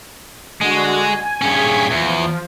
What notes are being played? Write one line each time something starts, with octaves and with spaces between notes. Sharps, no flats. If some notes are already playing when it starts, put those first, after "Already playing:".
D3 G#3 F#4
G#5
G2 C#4 G#4 G#6 B6
E2 F3